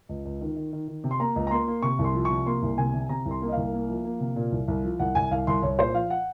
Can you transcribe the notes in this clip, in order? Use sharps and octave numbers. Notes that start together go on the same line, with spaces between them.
C#2
C#2
D#3
D#3
D#3
D#3
C3
C6
A#3 A#5
C#2
A#5
A#3 C6
A#3
C3 C#6
C2
C6
F3
C#6
C3
A#3 C6
C2
C3 G#5
C3
C3 A#5
C2
C6
A#3
D#5
C2 F5
A#3
F3
A#3
C3
A#2
C2
C2
F3
C2 F#5
C2 G#5
C2 F5
C2 C6
C2 C#5
A#2 C5
F3 F5
F#5